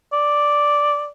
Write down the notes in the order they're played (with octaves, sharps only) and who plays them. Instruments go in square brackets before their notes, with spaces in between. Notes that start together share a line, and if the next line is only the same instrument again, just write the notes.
[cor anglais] D5